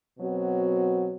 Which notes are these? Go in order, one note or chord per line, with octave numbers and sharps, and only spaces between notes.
B2 F#3 C4 F#4